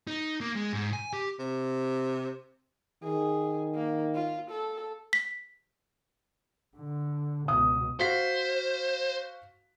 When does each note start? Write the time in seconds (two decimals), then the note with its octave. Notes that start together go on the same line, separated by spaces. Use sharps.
0.07 D#4
0.41 A#3
0.56 G#3
0.73 G#2
0.93 G#5
1.13 G4
1.39 C3
3.03 D#3 G#4
3.75 A#3
4.15 F4
4.51 A4
5.13 B6
6.77 D3
7.48 C#2 B2 D#6
8.00 F#4 C5 F5 B6